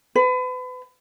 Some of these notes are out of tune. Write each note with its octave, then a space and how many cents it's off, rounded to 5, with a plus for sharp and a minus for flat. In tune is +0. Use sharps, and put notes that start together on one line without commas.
B4 +35